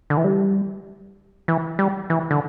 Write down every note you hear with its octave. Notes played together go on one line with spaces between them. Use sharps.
D3
E3
G3
E3
G3
E3
D3